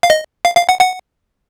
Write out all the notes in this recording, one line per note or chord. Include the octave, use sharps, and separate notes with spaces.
F5
D#5
F5
F5
F#5
F#5